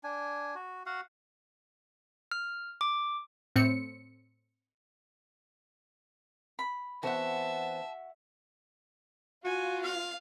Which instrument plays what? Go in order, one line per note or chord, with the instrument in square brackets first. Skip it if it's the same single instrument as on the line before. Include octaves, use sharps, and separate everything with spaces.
[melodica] D4 G#5
F#4
F#4 F5 F#5
[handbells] F6
D6
[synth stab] A2 C4 C#7
[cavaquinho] B5
[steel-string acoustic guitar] E3 B3 C4 [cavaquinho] F#4 F#5 [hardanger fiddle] E5 [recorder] A5
[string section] F4 [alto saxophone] F#4 [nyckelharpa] G#5
[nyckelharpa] F5